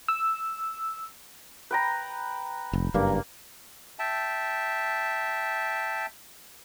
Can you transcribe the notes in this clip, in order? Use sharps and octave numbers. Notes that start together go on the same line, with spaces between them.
E6
B4 G5 A#5
F1
F#1 G2 A#3
E5 G5 A5